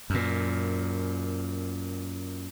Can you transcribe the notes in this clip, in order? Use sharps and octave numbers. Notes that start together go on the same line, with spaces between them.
F#2 A#2